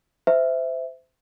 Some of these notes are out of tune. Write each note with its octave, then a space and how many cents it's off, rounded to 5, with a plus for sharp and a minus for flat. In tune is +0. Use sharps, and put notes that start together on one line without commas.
C5 -30 E5 +0